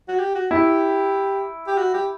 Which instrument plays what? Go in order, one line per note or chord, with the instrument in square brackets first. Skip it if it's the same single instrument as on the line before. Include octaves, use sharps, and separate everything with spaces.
[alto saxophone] F#4
G4
F#4
[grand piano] E4 [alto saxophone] G4
[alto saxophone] G4
F#4
G4